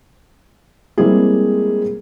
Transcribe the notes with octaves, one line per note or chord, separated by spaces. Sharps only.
G3 G#3 A#3 C4 E4 G#4